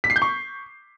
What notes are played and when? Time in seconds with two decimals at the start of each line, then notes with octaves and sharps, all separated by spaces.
0.04 B6
0.10 C7
0.16 G6
0.22 C#6